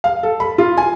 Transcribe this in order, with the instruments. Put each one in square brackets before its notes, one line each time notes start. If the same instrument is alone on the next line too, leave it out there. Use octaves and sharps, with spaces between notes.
[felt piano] F5
A4
B5
F4
G#5